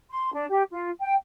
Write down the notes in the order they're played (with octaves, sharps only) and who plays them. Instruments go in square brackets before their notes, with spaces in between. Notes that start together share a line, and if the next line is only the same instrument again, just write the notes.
[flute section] C6
D4
G4
F4
G5